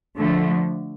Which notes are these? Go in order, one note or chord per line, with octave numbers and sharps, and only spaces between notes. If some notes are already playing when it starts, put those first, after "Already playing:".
D3 F3 A3